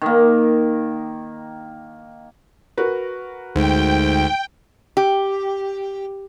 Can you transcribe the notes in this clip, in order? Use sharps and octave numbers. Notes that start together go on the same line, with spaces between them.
D#3 A#3
F#4 A#4 B4
D2 G#2 G5
G4